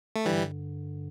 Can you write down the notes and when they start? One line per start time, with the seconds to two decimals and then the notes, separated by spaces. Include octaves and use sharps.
0.16 A3
0.26 G2 D3 E3 G3